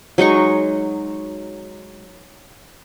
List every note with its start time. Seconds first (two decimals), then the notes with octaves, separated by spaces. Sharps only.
0.18 F#3 G#3 D#4 C#6